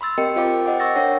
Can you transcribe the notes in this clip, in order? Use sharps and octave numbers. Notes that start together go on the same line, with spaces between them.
B5 C6 E6 A6
C4 G4 A#4 D#5 G5 C#7
F4 C5 F5 G5 D6
A#4 C5 D#5 F#5 G5 D6
C#6 E6 A6 A#6
D4 A#4 C#5 F#5 G5 A#6